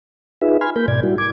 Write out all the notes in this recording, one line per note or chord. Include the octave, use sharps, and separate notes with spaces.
D#4 F4 G#4 B4 E5
G#5 B5 C6 F6 G#6
A#3 A#4 B5 G6
G#2 B2 D5 G#6
G3 E4 F#4
D6 G#6